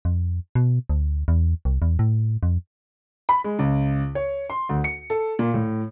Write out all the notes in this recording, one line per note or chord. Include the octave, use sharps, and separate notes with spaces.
F2
B2
D2
E2
C2
E2
A2
F2
B5
G#3
C#2
C#5
C6
D2
C#7
A4
A#2
A2